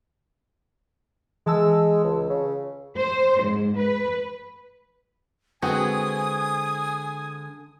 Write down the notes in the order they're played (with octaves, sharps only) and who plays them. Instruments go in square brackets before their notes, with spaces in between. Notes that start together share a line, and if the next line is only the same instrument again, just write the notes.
[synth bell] E3 A5 E6 [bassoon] G#3
[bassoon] C#2
C#3
[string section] C5
G#2
B4
[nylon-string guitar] D3 G#3 [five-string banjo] B3 C4 F#4 [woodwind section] G#5 [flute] D#6